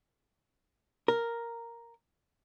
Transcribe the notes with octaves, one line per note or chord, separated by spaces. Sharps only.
A#4